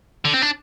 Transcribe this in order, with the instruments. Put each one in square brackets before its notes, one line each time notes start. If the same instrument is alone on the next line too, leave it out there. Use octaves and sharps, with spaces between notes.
[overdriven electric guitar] D3
C4
D4